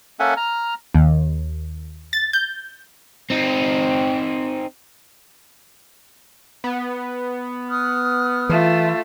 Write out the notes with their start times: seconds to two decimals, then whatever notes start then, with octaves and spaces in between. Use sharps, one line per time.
0.20 A#3 C#4 A4 E5 F#5 G#5
0.37 A#5 F6
0.94 D#2
2.13 A6
2.33 G6
3.30 C4 D#4
6.64 B3
7.68 D#6 F6 F#6
8.49 E3 A3 F4